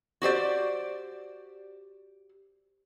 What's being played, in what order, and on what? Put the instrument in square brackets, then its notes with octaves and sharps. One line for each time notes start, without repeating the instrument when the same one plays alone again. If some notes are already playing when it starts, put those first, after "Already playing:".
[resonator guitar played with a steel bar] F#4 G4 C5 D5